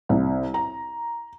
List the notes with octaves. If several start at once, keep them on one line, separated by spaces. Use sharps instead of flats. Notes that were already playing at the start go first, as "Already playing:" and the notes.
C2
A#5